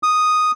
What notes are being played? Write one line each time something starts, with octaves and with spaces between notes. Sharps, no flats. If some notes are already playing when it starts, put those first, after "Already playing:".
D#6